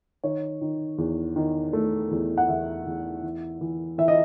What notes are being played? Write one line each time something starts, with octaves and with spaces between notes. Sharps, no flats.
D#3 C#5
D#3
E2
D#3
A3
E2
F#5
E2 E5
E2
E3
E3
E3 E5
D#5